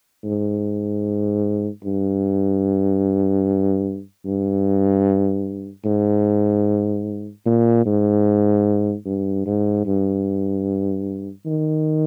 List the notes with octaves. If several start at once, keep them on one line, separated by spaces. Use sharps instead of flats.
G#2
G2
G2
G#2
A#2
G#2
G2
G#2
G2
D#3